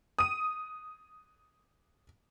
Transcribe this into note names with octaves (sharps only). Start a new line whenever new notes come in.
D#6 D#7